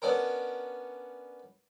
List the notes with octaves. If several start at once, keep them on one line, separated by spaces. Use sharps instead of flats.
B3 C#4 D4 G4 A#4